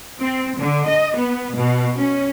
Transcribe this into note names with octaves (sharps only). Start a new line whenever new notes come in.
C4
D3
D#5
B3
B2
C#4